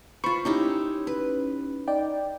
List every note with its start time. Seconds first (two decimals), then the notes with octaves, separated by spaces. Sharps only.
0.24 F4 C5 B5 C#6
0.45 C#4 D#4 E4 G4
1.07 B4
1.88 D#4 D5 G5